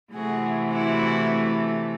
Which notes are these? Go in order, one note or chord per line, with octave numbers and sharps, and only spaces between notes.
C3 E3 A3 F#4 G#4
E4 F#4